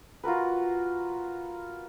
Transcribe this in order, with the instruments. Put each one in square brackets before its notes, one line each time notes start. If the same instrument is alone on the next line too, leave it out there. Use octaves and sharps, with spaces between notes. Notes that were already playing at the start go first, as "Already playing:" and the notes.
[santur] F4 F#4 A#4 B4